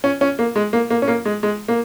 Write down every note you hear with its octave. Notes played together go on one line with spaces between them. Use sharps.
C#4
C#4
A#3
G#3
A#3
A#3
C#4
A#3
G#3
G#3
A#3